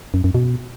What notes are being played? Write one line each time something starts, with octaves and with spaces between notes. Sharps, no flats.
F#2
F#2
B2